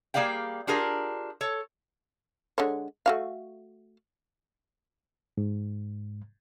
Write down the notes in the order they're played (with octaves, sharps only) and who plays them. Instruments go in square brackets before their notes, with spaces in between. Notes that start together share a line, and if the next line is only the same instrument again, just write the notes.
[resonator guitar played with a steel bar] G3 A#3 G#4 D5 F5 G5
D4 F4 G4 G#4 A#4
A4 C#5
[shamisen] D3 G#3 C#5
A3 F#4 F5
[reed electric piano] G#2